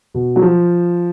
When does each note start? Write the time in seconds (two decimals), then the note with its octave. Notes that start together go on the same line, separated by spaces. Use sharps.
0.14 B2
0.36 F#3
0.42 F3